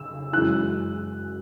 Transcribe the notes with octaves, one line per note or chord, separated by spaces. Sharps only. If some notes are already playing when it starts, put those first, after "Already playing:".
Already playing: C#3 E6
F#2 E3 G#3 C#4 E4 F#6